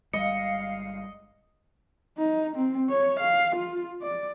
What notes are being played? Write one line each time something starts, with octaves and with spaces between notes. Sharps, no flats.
G1 G3 G#3 D#5 F5 C#7
D#4
C4
C#5
F5
F4
D5